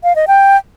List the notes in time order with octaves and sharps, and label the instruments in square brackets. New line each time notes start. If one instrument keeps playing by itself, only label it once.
[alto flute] F5
D#5
G5